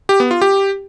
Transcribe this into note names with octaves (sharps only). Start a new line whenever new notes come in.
G4
B3
F4
G4